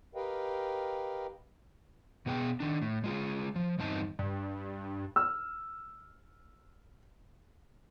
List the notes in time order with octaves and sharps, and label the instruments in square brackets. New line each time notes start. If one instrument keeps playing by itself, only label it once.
[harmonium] G4 A#4 B4 D#5 F5 G5
[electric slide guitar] B2 B3 G#4 G5
D#3 D4
A2
G#3 F4 G#4
F3
E2 G2 C4 D#4 A5
[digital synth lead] G2
[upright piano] E6 F6